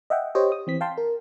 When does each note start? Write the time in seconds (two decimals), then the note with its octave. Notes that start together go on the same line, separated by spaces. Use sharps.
0.10 D#5 E5 F#5 G5
0.35 G4 C5 C#5 D#5 G5
0.52 D#6
0.67 E3 C4 B6
0.81 F5 G5 A5 C6
0.98 A#4